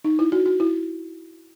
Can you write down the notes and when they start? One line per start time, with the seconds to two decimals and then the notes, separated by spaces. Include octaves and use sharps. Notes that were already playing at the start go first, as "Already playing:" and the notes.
0.05 D#4
0.19 E4
0.32 F#4
0.46 F#4
0.60 E4